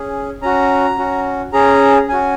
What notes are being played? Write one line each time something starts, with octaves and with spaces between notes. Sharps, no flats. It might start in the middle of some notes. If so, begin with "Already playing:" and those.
Already playing: C#4 G#4
C#4 F#4 A#5
C#4 F#4
C#4 G#4 A#5
C#4 F#4 G#5